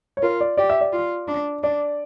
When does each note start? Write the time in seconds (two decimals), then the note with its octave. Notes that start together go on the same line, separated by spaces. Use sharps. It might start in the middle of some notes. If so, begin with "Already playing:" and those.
0.17 C#5
0.22 F4 A#4
0.41 D5
0.57 G4 D5
0.70 E5
0.81 D5
0.93 F4
1.28 D4
1.63 D4 D5